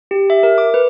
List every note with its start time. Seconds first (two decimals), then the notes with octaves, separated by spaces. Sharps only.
0.11 G4
0.30 E5
0.43 A#4
0.58 D6
0.74 B4